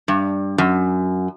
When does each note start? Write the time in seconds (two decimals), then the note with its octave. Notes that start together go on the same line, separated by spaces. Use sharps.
0.08 G2
0.58 F#2